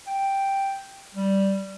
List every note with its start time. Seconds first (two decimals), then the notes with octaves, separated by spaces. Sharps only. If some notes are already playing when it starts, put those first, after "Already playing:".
0.07 G5
1.15 G3